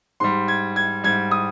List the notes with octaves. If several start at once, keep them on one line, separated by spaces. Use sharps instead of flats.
G#2 G3 C6
G#6
G#6
G#2 G3 G#6
D#6